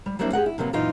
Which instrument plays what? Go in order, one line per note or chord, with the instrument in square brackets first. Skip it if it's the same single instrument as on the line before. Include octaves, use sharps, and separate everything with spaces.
[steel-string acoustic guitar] G3
F#3 G3 A#3 C4 D4 E4
G4 G#4 A#4 F#5
E4
C3 F3 F#3 A#3 B3
F#2 A#2 E3 D#4 F4